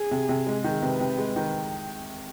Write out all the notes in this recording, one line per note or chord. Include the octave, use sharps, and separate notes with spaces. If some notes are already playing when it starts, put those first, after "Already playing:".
Already playing: G#4
C3
C3
G#3
D#3
C3 B4
C3
G#3
D#3